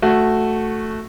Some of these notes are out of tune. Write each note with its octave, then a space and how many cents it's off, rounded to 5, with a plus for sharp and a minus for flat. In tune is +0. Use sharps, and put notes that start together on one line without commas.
A3 +0 F#4 +0